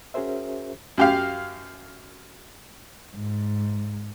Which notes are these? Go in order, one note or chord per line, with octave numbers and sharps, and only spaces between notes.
C#4 F#4 G#4 A#4 C5 E5
F#2 G4 F5
G#2